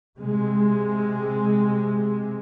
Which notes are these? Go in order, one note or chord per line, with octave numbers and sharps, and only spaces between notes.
C3 G#3